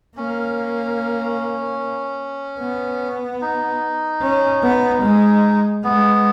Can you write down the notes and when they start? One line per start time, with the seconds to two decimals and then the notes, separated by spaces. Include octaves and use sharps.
0.17 A#3 C#4
2.60 B3
3.42 D#4
4.22 C#4
4.63 B3
5.03 G#3
5.84 G#3 B3